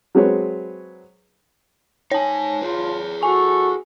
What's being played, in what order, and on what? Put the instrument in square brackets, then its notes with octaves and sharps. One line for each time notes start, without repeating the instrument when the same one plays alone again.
[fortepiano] F#3 G#3 C4 G#4 B4 C#5
[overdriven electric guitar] D#4 G#5 [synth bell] C#5 A5
[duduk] F4 [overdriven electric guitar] G#4 B4
[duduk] F#4 [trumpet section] A4 C#6 [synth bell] G#5